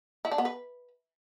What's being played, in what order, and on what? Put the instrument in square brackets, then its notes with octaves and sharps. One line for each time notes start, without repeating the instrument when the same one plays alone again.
[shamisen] E4
D4
B3
B4